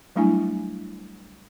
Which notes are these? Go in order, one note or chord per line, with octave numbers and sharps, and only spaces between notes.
F#3 G3 A3 D4 E4 G#5